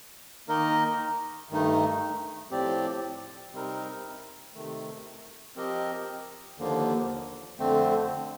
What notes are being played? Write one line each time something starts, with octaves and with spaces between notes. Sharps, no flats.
D#3 A#3 D#4 A#4 D#5
G2 D#3 A3 D#4
A2 F3 C4 G4 D5
C3 G3 C4 D#4 A#4
C3 D#3 A3
F3 C4 G4 A#4 D#5
D#2 D3 F3 A#3
F2 D3 A3 C4